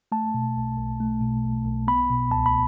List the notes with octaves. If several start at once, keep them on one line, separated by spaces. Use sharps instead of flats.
A3 A5
B2
B1
B1
A3
B2
B1
B1
B3 B5
B2
C#2 A5
B5